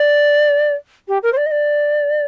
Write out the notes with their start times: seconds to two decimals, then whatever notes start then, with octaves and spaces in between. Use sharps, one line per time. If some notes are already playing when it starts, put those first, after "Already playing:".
Already playing: D5
1.08 G4
1.22 A#4
1.32 C5
1.37 D5
1.46 D#5
1.51 D5